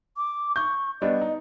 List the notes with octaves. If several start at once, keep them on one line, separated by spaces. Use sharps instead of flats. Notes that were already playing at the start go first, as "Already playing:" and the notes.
D6
C#6 G6
G3 B3 D4 D#5
D#4